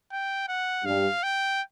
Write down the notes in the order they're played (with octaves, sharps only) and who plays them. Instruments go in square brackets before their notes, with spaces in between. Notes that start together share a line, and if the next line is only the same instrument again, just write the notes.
[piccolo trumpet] G5
F#5
[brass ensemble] G2 G3 [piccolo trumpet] F5
[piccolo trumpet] G5